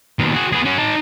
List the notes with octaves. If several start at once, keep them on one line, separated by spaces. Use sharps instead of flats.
D#2 B2
F#4 G#4
B3 G#4
C#4 F#4
D#4 A5